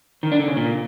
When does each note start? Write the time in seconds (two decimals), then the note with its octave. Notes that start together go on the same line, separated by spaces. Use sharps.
0.23 D#3
0.31 D4
0.40 D3
0.48 C#3
0.57 A#2